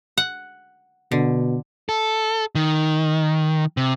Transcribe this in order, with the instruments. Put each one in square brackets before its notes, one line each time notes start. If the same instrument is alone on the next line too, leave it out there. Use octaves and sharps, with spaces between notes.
[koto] F#5
[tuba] B2 [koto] D3
[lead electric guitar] A4
D#3
C3